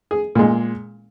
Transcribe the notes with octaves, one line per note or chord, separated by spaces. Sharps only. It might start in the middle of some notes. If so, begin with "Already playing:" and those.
G#4
A#2 G#3